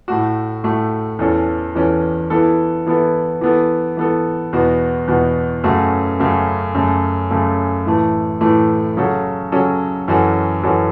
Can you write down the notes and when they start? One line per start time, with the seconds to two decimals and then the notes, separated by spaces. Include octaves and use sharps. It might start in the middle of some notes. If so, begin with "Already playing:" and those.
0.08 A2 A3 F#4
0.64 A2 A3 F#4
1.19 E2 E3 C#4 A4
1.75 E2 E3 C#4 A4
2.30 E3 B3 E4 A4
2.86 E3 B3 E4 A4
3.41 E3 B3 A4
3.97 E3 B3 A4
4.53 E2 B2 B3 F#4
5.07 E2 B2 B3 F#4
5.64 F#2 C#3 A3 F#4
6.19 F#2 C#3 A3 F#4
6.75 F#2 C#3 A3
7.30 F#2 C#3 A3
7.85 A2 E3 A3
8.41 A2 E3 A3
8.97 C#3 F#3 C#4 F#4 A4
9.52 C#3 F#3 C#4 F#4 A4
10.08 F#2 E3 C#4 F#4 A4
10.63 F#2 E3 C#4 F#4 A4